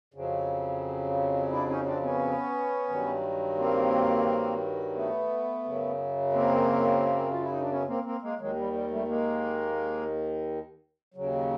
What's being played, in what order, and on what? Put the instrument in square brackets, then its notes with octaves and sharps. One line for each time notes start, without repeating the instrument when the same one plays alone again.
[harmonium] F2 C#3 F#3
D4 E4
C#4 D#4
C4 D4
B3 C#4
G2 D#3 F#3
A#3 C4
A3 B3
F#2 C#3 F#3
A#3 C4
F4
E4
D#4
D4
B3 C#4
A#3 C4
A#3 C4
G#3 A#3
D#2 D#3 F#3 G#3
G3
G3
G3 A3
G#3 A#3
D#2 C#3 F#3